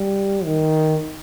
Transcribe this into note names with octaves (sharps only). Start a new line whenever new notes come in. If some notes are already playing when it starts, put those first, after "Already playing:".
Already playing: G3
D#3